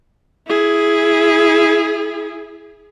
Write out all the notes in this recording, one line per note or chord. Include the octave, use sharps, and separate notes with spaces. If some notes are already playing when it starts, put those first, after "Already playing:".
E4 G#4